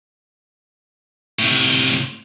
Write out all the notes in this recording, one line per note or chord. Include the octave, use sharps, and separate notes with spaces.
A2 C3